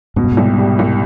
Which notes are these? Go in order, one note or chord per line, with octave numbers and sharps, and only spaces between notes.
G#2 B2
G2
G#2
C2
G3
C2